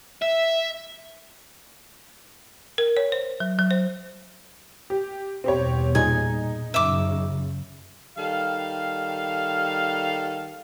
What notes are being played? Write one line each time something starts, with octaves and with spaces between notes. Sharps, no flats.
E5
A#4
C#5
C5
F#3
F#3
C5
G4
E2 G2 B2 C4 G4 C#5
A#2 G3 D#4 G#4 G#5
F#2 C#3 E5 D6
D#3 G3 A4 F5